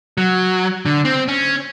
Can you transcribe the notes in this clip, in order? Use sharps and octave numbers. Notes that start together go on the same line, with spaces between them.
F#3
D3
C4
C#4